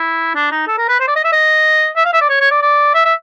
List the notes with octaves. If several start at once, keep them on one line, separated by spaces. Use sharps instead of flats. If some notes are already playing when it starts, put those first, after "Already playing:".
Already playing: E4
D4
D#4
A4
A#4
B4
C5
D5
D#5
E5
D#5
E5
F5
E5
D5
C#5
C#5
D5
D5
E5
E5